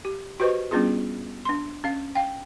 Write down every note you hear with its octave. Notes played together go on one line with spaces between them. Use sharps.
G4
F#4 G4 B4 C5 D#5 C#6
G3 B3 C#4 D4 F4 G#4
D4 C6
C#4 F5
F5 G5